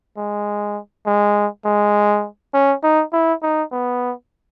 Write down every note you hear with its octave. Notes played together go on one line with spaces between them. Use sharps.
G#3
G#3
G#3
C#4
D#4
E4
D#4
B3